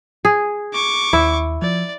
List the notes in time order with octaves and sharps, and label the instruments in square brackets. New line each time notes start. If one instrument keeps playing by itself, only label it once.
[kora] G#4
[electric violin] C#6 D6
[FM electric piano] D#2 [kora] E4
[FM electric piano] F3 [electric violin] D5